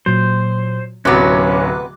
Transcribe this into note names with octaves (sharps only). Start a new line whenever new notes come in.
A#2 F#3 C5
D1 C3 F#3 B3 C#4 D6 F#6